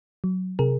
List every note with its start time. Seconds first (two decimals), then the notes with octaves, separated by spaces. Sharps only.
0.24 F#3
0.59 C3 G#4 A#4